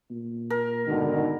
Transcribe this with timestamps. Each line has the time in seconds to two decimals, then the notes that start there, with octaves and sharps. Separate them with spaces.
0.10 A#2
0.50 A#4
0.87 G#2 B2 D3 D#3